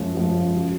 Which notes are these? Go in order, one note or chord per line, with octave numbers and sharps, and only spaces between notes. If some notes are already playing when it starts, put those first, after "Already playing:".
Already playing: F#2 F3 G#3 C#5
F#2 F3 G#3
C#3 F#3